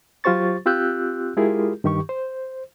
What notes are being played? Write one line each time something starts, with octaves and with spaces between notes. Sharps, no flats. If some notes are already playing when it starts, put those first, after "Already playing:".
F#3 F4 G4 C5 C#6 A6
C4 F4 G4 E6 F#6 G6
G#3 E4 F4 G4 G#4 A#4
G2 D#3 G4 C#6
C5